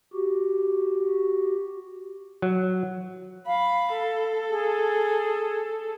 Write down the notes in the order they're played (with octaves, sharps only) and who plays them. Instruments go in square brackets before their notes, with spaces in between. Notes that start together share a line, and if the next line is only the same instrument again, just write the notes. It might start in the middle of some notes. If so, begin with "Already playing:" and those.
[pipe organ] F#4 G4
[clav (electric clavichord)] F#3
[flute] F5 [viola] B5
[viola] A4
[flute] G#4